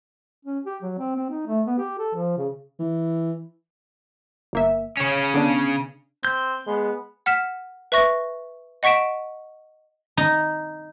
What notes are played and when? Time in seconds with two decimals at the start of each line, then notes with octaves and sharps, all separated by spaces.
0.45 C#4
0.64 G4
0.82 F#3
0.98 C4
1.15 C4
1.30 D#4
1.47 A3
1.66 B3
1.78 G4
1.99 A4
2.15 F3
2.37 C#3
2.79 E3
4.53 G1 A#3 E5
4.97 C#3 C#4 C#5 C#7 E7
5.34 D3 B3 D4
6.25 C4 G6
6.66 G#3 B3
7.26 F#5 F6 B6 E7
7.92 B4 E5 C#6 A#6
8.83 D#5 F#5 C#6 B6 D7 E7
10.17 D#4